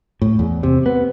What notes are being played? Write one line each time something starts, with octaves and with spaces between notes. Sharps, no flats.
A2
E2
C3
B3